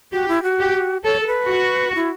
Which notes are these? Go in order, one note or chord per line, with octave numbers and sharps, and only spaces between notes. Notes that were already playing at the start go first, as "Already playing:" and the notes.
F#4 G4
E4
F#4
G4
A4 C#5
A4
B4
F#4
E4